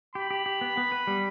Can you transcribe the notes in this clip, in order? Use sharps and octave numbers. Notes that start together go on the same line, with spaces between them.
G4 B5
G4
G4
B3
B3
B4
G3